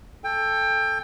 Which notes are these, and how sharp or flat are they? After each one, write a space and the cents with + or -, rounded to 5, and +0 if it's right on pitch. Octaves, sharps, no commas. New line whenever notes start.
A4 +0 G5 +25